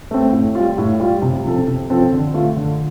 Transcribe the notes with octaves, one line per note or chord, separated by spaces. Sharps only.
A3 C4
A2
G3 F4
A2
G3 F4
C3
F3 C4 A4
C3
F3 C4 A4
D3
A3 F4
D3